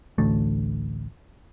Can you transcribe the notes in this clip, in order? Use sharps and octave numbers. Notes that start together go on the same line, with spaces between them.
A1 D2 A3